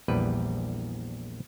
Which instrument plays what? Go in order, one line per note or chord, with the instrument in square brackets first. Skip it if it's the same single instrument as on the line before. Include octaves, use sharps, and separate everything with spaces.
[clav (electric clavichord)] A#1 E2 G3 B4